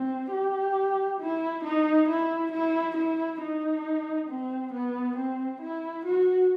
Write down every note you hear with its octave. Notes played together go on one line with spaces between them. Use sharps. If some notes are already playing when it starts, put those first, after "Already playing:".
Already playing: C4
G4
E4
D#4
E4
E4
E4
D#4
C4
B3
C4
E4
F#4